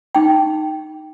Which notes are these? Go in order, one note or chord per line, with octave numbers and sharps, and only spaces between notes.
D#4 G5